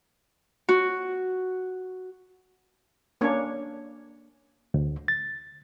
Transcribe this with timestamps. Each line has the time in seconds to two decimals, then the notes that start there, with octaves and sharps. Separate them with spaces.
0.69 F#4
3.21 A#3 C#4 D4 C#5
4.74 D2
5.08 A6